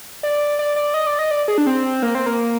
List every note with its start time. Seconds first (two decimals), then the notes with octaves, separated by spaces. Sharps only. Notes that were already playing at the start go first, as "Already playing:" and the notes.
0.23 D5
0.59 D5
0.76 D5
0.94 D#5
1.07 D5
1.19 D#5
1.31 D5
1.48 G#4
1.58 D4
1.67 C4
2.03 A#3
2.15 C4
2.26 A#3